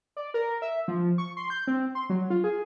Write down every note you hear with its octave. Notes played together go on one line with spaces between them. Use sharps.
D5
A#4
E5
F3
C#6
C6
G6
C4
C6
F#3
F4
G#4